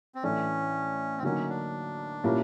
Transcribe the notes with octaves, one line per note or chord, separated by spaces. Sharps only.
C4
A2 E3 A3 C#4 D4
C4
D3 F#3 A#3 C#4 D#4
D4
A#2 G3 A#3 C#4 E4